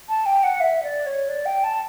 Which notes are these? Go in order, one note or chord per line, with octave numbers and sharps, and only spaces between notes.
A5
G5
F#5
E5
D5
C#5
D5
G5
A5